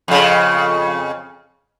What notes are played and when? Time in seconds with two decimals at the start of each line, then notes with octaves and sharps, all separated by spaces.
0.08 F2 C#3